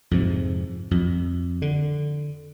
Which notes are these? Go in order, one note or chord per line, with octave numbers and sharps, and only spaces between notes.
F2 G#2 C3
F2
D3